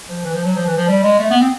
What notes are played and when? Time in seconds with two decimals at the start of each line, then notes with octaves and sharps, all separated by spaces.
0.09 F3
0.24 E3
0.34 F3
0.44 F#3
0.56 F3
0.67 E3
0.77 F3
0.88 G3
1.03 G#3
1.19 A3
1.31 B3
1.41 C4